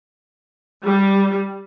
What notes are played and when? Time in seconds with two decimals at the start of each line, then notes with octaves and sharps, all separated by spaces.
0.86 G3